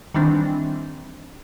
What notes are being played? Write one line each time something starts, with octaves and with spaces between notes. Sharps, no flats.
D#3 E3 G3 C4 D4